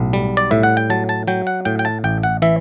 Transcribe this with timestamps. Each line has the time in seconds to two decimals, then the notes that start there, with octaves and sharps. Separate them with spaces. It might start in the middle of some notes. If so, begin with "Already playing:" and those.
Already playing: B1 A2
0.13 G3
0.37 D5
0.51 A2 E5
0.63 F#5
0.77 G5
0.90 F#3 A5
1.09 A5
1.28 F#3 G5
1.47 F#5
1.65 A2 G5
1.79 G5
1.85 A5
2.04 A1 G5
2.23 F#5
2.42 E3 E5